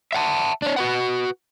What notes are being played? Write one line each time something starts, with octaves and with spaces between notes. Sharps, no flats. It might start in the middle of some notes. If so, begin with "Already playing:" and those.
E5 F#5 A5
D4 C#5
F#4 B4 F#5